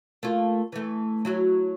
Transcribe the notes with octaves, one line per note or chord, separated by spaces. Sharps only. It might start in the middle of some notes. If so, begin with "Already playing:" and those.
A3 A#3 F4
E3 A3
F#3 E4 F#4